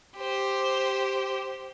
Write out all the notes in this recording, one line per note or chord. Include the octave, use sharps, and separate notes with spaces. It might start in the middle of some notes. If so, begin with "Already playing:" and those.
G4 C5